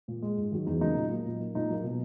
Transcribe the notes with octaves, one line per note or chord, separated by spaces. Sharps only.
A#2
G#3
G#2
D#3 F#3
E2 D#4
C#3 F#3 A#3 D#4
A#2
F#3 A#3
A#2
A#3
A#2 D#4
F#3 A#3
B2